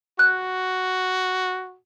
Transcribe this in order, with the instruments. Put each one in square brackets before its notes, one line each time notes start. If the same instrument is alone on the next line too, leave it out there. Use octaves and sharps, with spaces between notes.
[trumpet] F#4 [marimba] F#6